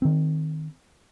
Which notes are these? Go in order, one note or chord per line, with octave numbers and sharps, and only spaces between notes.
D#3 C4